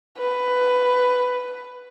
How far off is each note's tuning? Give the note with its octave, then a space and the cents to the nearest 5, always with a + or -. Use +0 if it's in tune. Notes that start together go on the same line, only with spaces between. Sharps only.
B4 +10